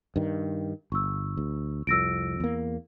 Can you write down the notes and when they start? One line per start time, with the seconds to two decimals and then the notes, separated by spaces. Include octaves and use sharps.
0.16 G2 D#3
0.92 G1 C#6 E6
1.37 D2
1.87 C2 F2 E6 A#6 D7
2.40 E2 A#3